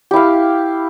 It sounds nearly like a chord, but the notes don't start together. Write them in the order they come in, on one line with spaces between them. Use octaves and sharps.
G4 E4 F5